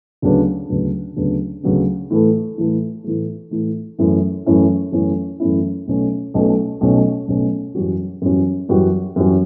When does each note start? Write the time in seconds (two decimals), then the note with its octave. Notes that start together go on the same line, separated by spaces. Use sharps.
0.22 D2 C#3 F#3 B3 D4
0.69 D2 C#3 F#3 B3 D4
1.16 D2 C#3 F#3 B3 D4
1.63 D2 C#3 F#3 B3 D4
2.10 A2 E3 A3
2.58 A2 E3 A3
3.04 A2 E3 A3
3.51 A2 E3 A3
3.98 F#2 E3 A3 C#4 E4
4.46 F#2 E3 A3 C#4 E4
4.92 F#2 E3 A3 C#4 E4
5.40 F#2 E3 A3 C#4 E4
5.87 B1 B2 A3 C#4
6.34 B1 B2 A3 C#4
6.81 B1 B2 A3 C#4
7.28 B1 B2 A3 C#4
7.75 F#2 E3 G3 C#4 F#4
8.22 F#2 E3 G3 C#4 F#4
8.69 F#2 E3 G3 C#4 F#4
9.16 F#2 E3 G3 C#4 F#4